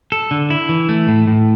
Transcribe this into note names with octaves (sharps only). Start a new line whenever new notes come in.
A4
D3
E4
E3
A3
A2
A2